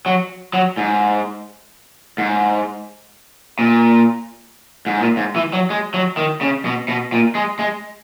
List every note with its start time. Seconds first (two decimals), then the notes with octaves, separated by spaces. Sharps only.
0.06 F#3
0.54 F#3
0.77 G#2
2.18 G#2
3.59 A#2
4.87 G#2
5.01 A#2
5.17 G#2
5.36 E3
5.53 F#3
5.70 G#3
5.94 F#3
6.17 D#3
6.41 C#3
6.65 B2
6.88 B2
7.12 A#2
7.35 G#3
7.59 G#3